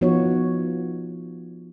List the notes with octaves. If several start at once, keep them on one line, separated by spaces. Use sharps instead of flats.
F3 B3 D#4 F4 F#4 C#5